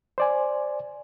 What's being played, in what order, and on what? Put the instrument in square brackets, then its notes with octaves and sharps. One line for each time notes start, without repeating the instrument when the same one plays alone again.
[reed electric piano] C5 D5 G#5